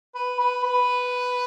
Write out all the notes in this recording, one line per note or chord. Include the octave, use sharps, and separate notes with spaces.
B4
B4
B4